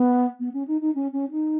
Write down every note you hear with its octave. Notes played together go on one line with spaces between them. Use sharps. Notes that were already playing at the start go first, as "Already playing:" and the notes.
Already playing: B3
B3
C#4
D#4
D#4
C#4
C#4
D#4